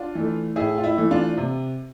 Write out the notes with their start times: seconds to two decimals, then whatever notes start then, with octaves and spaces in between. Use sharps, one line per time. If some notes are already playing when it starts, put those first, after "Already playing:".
Already playing: D4 F4
0.15 E3 A3
0.56 A2 E4 G#4
0.78 F4
0.84 E4
0.97 E3 A3
1.11 D4 F4
1.37 C3